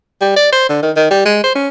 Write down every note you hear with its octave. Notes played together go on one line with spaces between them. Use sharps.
G3
D5
C5
D3
D#3
D#3
G3
G#3
C5
C#4